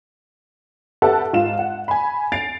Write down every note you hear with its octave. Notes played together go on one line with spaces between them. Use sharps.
G4 A4 B4 E5 F#5 A5
G#2 F4 E7
F#5
G#5 B5
A6 C7 D7 F7